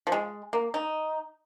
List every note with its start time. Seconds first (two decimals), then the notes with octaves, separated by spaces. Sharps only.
0.07 F3
0.12 G#3
0.53 A#3
0.74 D#4